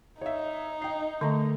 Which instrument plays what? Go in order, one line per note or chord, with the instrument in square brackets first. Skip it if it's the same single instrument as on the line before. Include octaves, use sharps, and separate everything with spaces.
[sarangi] D#4 [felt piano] C#5 E5
[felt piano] G5 C7
[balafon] D3 [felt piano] A3 A#5